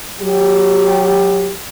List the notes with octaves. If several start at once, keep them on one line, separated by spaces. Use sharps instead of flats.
F#3 G4